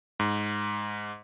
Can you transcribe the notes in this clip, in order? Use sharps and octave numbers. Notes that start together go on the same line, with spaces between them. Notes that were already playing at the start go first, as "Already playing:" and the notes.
G#2